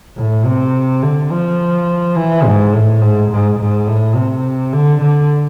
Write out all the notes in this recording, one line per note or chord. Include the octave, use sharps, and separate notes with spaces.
A2
C3
D3
F3
E3
G#2
A2
G#2
G#2
G#2
A2
C3
D3
D3